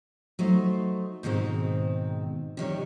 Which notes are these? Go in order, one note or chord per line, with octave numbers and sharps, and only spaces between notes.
F#3 A3 D#4 C5
G#2 B2 D#3 G#3 C4
C3 D#3 G3 C#5